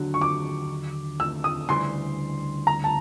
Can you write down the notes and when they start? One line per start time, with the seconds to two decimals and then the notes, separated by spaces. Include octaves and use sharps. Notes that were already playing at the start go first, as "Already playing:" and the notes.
Already playing: D#2 D3 F#3
0.14 C#6
0.21 D6
1.20 E6
1.44 D#6
1.69 D2 C#3 E3 G3 C6
2.67 A#5
2.84 A5